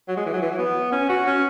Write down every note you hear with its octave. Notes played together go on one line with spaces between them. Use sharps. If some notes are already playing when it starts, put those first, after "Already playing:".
F#3
G#3
E3
F#3
E3
F#3
B3
C#4
F#4
C#4